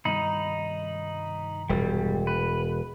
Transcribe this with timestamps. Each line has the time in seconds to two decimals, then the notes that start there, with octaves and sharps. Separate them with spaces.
0.05 C2 G2 D#3 D#4 B5
1.69 E1 G3
2.27 B4